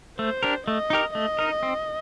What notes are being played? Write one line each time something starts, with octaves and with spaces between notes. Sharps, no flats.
A3 C5
D4 G4 A#4
A3 D#5
D#4 G4 A#4
A3 D#5
D#4 A#4
C4